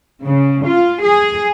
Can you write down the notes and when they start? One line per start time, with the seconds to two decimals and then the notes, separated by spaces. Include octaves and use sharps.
0.24 C#3
0.65 F4
1.02 G#4